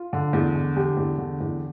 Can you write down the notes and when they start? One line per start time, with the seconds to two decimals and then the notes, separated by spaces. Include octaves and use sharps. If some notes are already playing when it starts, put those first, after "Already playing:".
Already playing: F4
0.13 D3
0.33 E2
0.55 D3
0.76 D3 G4
0.97 E2
1.18 D3
1.40 E2